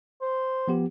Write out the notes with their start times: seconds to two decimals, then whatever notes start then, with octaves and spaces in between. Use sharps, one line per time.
0.22 C5
0.68 F3 B3 G4